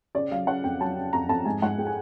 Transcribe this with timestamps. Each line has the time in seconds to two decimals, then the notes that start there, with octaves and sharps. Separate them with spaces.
0.15 C#3 D5
0.31 F#3 F5
0.47 C#3 F#5
0.64 F2 G5
0.80 F#3 A5
0.97 C#3
1.13 F2 A#5
1.29 F2 A5
1.45 G#2 G#5
1.62 G#2 F#5
1.78 G#3 G5
1.87 G#5